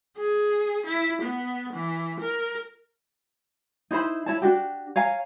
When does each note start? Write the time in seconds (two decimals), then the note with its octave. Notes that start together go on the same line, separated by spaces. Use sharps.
0.17 G#4
0.86 E4
1.22 B3
1.73 E3
2.20 A#4
3.91 D#4 E4 C5 B5
4.26 E4 C#5 A5
4.42 D4 F#4 G4
4.96 C#5 F5 G#5 A#5